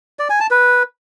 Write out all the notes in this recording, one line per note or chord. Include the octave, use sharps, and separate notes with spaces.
D5
G#5
A5
B4